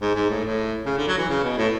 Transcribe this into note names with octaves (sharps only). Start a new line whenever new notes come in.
G#2
G#2
A2
A2
C#3
D3
F#3
E3
C#3
B2
A2